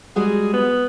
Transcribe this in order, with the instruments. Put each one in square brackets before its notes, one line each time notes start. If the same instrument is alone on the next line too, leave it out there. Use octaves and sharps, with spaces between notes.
[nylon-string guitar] G3 G#3 F#4 [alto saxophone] G#4
[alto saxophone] B3